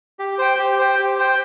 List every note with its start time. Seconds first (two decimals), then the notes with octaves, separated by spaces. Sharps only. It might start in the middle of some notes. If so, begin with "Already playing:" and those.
0.19 G4
0.39 C5 G5
0.59 G4
0.79 C5 G5
0.99 G4
1.19 C5 G5